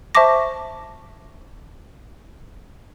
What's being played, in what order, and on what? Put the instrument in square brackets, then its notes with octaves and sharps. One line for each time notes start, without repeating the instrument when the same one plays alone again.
[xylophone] C5 E5 A5 C#6 D6 A#6